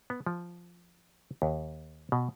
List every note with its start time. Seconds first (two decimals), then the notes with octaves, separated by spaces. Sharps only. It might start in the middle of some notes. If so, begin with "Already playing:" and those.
0.10 B3
0.26 F3
1.42 D#2
2.12 B2